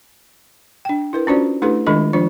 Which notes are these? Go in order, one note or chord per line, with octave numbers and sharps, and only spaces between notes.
D4 G5
E4 A#4 B4
C#4 D4 F4 F#4 C5 D5
A3 D4 E4 G4 A4 B4
D#3 G#3 D4 F4 A4 D#5
F3 D4 F4 C5